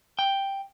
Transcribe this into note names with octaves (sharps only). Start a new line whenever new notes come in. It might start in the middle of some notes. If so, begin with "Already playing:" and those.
G5